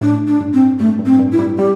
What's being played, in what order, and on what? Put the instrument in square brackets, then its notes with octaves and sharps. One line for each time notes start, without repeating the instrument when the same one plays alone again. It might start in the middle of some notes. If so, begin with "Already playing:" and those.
[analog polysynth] A2 [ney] D4
[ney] D4
[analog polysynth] G2
[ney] C4
[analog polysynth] G2 [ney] A3
[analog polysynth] G2
[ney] C4
[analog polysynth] G2
[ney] E4
[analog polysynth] G3
[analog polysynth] G3 [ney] G4